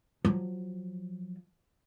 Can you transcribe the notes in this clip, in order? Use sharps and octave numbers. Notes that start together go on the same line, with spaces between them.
F3 F#3